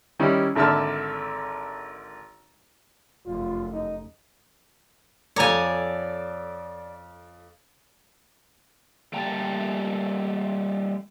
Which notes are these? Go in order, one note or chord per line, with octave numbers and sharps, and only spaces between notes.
D#3 G3 C#4 E4 G4
G#1 D3 E5 A5 E6 F6
F1 F#2 F4
D#4
F2 A4 C#5 D5 G#5 A#5
G3 A3 A#3 G5 A5 A#5